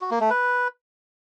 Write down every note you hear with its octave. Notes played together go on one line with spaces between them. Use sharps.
F#4
A#3
A3
B4